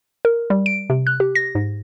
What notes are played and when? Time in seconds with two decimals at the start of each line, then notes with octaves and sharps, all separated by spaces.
0.25 A#4
0.50 G3
0.66 D7
0.90 C3
1.07 F#6
1.20 G4
1.35 A#6
1.55 G#2